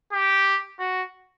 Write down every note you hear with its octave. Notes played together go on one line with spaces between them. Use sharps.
G4
F#4